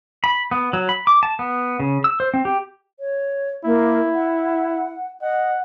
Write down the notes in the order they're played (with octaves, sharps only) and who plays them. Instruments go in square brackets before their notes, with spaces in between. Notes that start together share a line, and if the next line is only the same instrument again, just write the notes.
[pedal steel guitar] B5
B3
F#3
B5
D6
A5
B3
C#3
E6
C5
C4
G4
[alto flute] C#5
[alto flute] A#3 [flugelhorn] E4
[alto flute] F#5
[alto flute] D#5 [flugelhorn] F#5